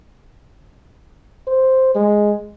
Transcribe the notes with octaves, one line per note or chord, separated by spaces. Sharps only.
C5
G#3